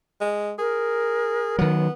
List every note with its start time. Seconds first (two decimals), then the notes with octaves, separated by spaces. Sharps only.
0.21 G#3
0.59 G#4 A#4
1.59 D#3 F#3 B3